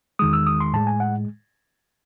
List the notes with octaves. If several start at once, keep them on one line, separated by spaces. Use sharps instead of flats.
E2 D#3 G#3 D#6
E6
D#6
C6
A2 G#3 A5
G#5
F#5